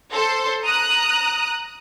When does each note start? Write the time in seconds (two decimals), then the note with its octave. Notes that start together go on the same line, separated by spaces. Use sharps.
0.11 A4 C5 C6
0.65 A#5 D#6 F#6